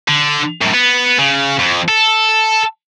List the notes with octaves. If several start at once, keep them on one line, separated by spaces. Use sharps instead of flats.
D3
F#2 A2
B3
C#3
F2
A4